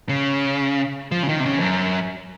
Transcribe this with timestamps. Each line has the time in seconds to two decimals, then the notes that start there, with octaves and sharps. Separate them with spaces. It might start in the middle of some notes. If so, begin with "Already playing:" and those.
0.09 C#3
1.12 F3
1.23 C#3
1.29 D#3
1.40 C3
1.45 C#3
1.58 F2
1.63 F#2